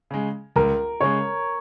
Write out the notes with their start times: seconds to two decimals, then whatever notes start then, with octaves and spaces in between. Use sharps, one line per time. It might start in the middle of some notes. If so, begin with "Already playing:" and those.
0.11 C#3 G#3
0.56 C#2 A#4
1.01 C#3 G#3 C#5